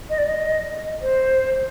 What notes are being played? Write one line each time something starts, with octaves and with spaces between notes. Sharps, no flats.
D#5
D5
D#5
C5